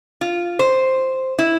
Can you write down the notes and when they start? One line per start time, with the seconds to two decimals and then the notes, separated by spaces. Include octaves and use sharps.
0.21 F4
0.59 C5
1.39 E4